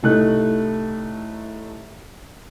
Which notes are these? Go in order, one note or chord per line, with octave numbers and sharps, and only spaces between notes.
C2 A2 A3 D#4 F#6